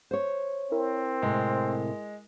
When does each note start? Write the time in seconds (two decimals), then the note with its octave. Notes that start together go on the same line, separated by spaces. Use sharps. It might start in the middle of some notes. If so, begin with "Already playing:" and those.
0.11 C5 C#5
0.72 C4 E4 A#4
1.22 A2 C3 G#3